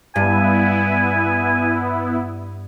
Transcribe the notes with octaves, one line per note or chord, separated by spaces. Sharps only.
G2 B3 E4 G#5